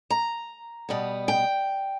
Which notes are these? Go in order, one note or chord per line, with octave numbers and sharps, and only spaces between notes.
A#5
B2 G3 B3
G5